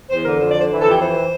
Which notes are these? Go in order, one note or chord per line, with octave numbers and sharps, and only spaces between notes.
E2 C5
D3 A#4
F2 C5
D5
D3 C5
E3 C5
A4
F2 G4
E3 C5